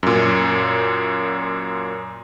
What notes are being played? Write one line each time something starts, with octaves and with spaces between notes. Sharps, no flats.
F#2 A#2